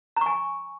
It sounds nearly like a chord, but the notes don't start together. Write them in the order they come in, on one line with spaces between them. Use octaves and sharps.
A#5 C#6 G#5